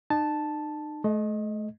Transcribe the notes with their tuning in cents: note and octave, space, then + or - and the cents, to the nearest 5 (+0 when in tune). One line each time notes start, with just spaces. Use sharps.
D#4 -40 A5 +0
A3 -35 D#5 +0